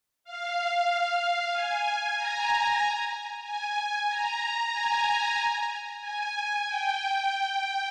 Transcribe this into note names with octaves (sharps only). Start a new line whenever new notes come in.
F5
G#5
A#5
G#5
G#5
A#5
G#5
G#5
G5